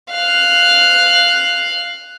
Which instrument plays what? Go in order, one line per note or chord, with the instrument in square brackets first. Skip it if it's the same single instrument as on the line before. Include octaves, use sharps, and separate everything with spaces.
[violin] F5 F#6